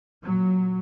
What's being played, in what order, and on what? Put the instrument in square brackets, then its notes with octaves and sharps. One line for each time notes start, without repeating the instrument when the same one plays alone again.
[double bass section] A#2 F#3